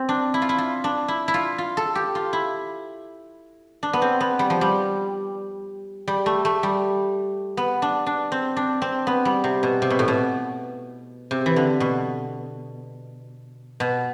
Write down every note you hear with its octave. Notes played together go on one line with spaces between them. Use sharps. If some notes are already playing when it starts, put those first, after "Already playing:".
Already playing: C4
D4
E4
F4
E4
F4
D4
E4
E4
F4
F4
A4
G4
F4
E4
D4
B3
C4
B3
G3
F3
G3
G3
A3
A3
G3
B3
D4
D4
C4
D4
C4
B3
G3
C3
B2
C3
B2
A2
B2
C3
E3
D3
B2
B2